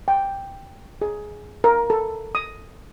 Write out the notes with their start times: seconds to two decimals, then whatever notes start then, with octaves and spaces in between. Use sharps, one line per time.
0.08 G5
1.02 G#4
1.64 A#4
1.90 A4
2.35 D#6